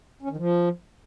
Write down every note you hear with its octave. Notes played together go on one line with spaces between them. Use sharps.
C#4
D#3
F3